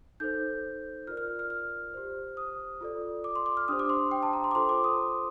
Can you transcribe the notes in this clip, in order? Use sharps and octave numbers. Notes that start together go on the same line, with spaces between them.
D#4 A4 C5 G6
F4 A#4 D5 F6
F6
F6
F6
G4 C5
D#6
F4 A4 D5
D6
C6
D6
F6
D4 G4 C5 D#6
D6
C6
G5
A5
A#5
C6
D6
F4 A4 C5 C6
D6
D#6